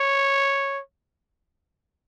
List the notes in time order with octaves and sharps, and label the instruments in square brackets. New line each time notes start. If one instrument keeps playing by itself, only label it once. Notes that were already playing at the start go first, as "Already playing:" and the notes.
Already playing: [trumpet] C#5